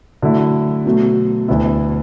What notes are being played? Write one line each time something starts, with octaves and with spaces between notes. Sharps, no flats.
D3 F#3 A3 E4
B2 F#3 A3
D2 D3 B3 E4